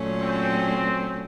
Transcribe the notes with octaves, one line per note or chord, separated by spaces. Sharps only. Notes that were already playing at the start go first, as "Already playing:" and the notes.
Already playing: A#2 F#3 A3 C#4
C4